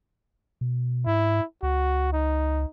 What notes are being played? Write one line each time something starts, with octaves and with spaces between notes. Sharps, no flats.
B2
G#2 E4
C#2 F#4
D#4